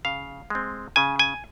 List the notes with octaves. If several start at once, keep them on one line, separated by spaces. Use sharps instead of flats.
C#3 F5
G#3 C4
C#3 G#5
G#5